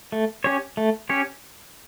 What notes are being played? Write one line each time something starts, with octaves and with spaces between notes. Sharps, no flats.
A3
C#4 G4 C#5
A3
C#4 G4 C#5